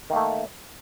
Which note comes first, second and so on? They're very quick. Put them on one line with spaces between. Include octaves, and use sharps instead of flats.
D#3 A#3 A3